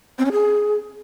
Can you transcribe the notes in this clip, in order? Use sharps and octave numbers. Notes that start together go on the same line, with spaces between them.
C4
C#4
G#4